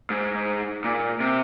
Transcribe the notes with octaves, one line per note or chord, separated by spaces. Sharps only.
G#2
A#2
C3